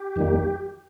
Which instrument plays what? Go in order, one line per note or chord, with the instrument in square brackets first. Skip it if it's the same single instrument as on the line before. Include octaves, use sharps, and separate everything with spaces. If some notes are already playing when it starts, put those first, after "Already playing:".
Already playing: [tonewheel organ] G4
F2 D#3 G3 A#3